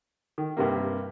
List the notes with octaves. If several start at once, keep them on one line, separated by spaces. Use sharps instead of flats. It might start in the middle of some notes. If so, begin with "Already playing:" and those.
D#3
G2 C3 A#3